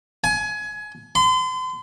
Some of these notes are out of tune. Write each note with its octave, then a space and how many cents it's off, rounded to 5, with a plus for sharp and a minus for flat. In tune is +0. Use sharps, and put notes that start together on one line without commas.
G#5 +25
C6 -40